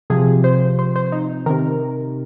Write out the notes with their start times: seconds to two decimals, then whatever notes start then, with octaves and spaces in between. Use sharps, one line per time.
0.10 C3 F3 G#4
0.44 C5
0.79 C5
0.96 C5
1.12 D#4
1.46 C3 D#3 A#4